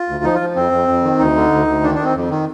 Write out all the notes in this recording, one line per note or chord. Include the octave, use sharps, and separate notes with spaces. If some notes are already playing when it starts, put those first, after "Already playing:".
Already playing: F4
D2
F3 D#4
F4
F3
F2 C4
F2
F2
D#3
D2 D#4
D3
D2
D2
D#3 D4
D#3 D4
C4
F2
D#3